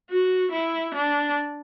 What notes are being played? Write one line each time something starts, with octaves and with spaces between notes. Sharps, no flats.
F#4
E4
D4